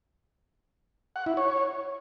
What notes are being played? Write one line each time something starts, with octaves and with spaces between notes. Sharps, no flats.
F#5
E4
C#5